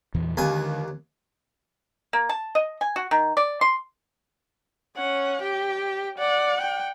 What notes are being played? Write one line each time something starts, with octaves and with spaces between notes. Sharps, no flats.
E2 A#2 E3
D#2 D3 G#3 G#5
A#3
A5
D#5
G#5
F#4
D#3
D5
C6
C#4 F#5
G4 G5
D5 F#5
G5